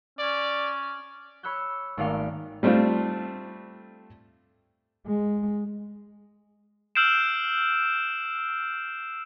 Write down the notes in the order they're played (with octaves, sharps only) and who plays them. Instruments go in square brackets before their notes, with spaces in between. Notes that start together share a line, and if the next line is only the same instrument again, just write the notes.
[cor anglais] C#4 [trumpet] D5
[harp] C#5 B5 E6 F#6 G6
G#1 A3 A#3 D5 F5 G5
[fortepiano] G3 A3 C4 D4 F4
[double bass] G#3
[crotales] E6 F6 G6 C7 D7 E7